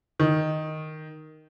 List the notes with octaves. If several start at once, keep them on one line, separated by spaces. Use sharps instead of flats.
D#3